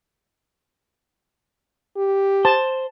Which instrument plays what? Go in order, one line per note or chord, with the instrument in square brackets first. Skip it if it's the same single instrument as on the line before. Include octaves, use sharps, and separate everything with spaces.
[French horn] G4
[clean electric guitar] C5 [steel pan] A5